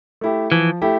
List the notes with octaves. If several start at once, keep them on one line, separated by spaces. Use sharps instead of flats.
A3 E4 G4
E3 F3
A3 E4 G4